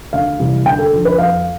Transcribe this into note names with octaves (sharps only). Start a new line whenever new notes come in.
D2 F5
C3 E3 G3
D2 G5
A4
D3 F3
B4
F2 F5